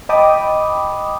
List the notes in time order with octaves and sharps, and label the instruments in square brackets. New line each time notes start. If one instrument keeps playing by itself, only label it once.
[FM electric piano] D#5 G5 A5 B5 D6 D#6